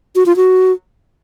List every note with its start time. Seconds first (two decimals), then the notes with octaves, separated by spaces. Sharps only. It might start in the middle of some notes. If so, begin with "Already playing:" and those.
0.16 F#4
0.26 F4
0.36 F#4